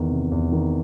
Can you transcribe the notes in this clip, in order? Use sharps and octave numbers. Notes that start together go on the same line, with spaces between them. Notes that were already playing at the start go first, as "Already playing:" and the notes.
Already playing: E2 D#3
C3
E2
D#3